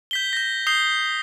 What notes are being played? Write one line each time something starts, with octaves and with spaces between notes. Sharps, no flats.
G6 B6 G7
G6 A#6
D#6 G6 C7 G7